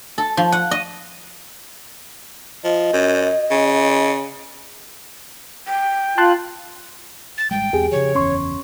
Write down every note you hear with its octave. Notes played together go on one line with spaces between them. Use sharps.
A4
F3
F#5
D#5
F3 D#5
F#2
C#3
G5
F4 A5 C6 F#6
A6
G#1 G3 G#3 G5
E2 G#3 C4 G4 G#4
C#3 E3 F3 C#5
F#1 E2 C#4 C6 C#6